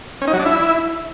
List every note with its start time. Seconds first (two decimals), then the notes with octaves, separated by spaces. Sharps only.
0.22 C#4
0.27 D#4
0.33 F#3
0.39 D4
0.45 E4